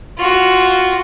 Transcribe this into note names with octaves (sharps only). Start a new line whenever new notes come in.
F4 F#4